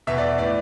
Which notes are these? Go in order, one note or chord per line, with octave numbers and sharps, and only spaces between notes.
E2 B2 E5
D5
A2 E3 D5